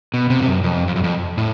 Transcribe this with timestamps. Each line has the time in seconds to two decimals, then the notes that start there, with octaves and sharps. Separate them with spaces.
0.14 B2
0.30 C3
0.40 G2
0.46 F#2
0.64 F2
0.88 F2
0.96 F#2
1.04 F2
1.37 A2